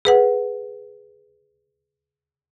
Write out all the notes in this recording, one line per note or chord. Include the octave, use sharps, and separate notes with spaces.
G#4 B4 F#5